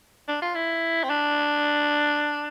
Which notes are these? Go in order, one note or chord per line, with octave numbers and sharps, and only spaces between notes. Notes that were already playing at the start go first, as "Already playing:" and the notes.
D4
F4
E4
C4
D4